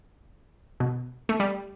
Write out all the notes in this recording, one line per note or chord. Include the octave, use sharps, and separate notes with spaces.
B2
A3
G3